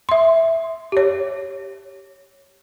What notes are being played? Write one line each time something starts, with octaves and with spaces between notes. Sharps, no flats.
E5 C6
G4 C#5